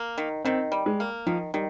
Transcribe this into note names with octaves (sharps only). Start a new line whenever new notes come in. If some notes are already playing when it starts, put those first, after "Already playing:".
Already playing: A#3
D#3
D#3 C4
G3
G#3
A#3
D#3 F3
D#3 G3